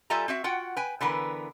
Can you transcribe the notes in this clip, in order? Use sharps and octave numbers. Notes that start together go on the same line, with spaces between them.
G3 F4 A4 E5 G#5 A#5
C4 F#4 E5
F4 F#4 F#5 G5
B4 G5 G#5
D3 E3 B3 A#4 B4